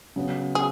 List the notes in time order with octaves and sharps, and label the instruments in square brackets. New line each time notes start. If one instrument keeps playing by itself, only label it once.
[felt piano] C#3 F#3 B3
[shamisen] G#4